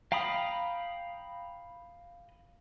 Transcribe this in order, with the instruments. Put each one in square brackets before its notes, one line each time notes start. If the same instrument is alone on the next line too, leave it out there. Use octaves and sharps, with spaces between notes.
[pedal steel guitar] F5 G5 A#5 B5 D#6